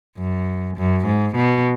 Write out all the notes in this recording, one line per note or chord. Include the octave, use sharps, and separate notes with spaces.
F#2
F#2
G#2
B2